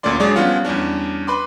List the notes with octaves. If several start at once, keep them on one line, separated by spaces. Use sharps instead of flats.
D2 A#2 A3 C#4 D5 C6
F#3 G#3 D4 G#4 C#5 D5
F3 G3 B3 C#4 F4 F#5
E2 G3 C#4 D4
B4 B5 C6 D6